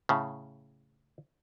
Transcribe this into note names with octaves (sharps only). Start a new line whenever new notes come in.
A2 C#3